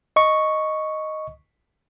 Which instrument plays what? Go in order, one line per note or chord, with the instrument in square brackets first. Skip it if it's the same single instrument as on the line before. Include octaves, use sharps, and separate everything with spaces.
[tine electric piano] D#5 C#6